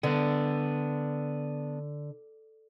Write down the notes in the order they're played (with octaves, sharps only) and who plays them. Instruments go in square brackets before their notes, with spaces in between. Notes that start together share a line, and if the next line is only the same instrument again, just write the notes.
[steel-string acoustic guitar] D3 [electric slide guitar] B3 D4